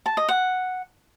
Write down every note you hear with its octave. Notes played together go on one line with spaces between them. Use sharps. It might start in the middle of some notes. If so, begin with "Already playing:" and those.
A5
D#5
F#5